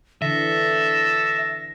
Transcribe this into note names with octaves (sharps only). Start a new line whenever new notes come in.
D3 E3 A4 E5 A#6